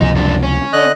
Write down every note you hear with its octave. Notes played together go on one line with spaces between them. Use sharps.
C#2 C3 F3 D#4 G#4
F#2 D4
C#4
D3 D#5 F#6